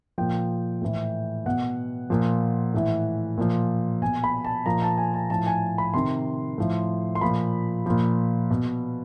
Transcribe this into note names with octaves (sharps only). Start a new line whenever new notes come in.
A#2 F3 G5
A2 E3
B2 F#5
A#2 F3
A2 E3
A#2 F3
B2 G#5
B5
A5
A#2 F3 A#5
A5
G#5
A5
A2 F3 A5
G#5
B5
C3 D#3 C6
A2 F3
C6
A#2 F3 B5
A#2 F3
B2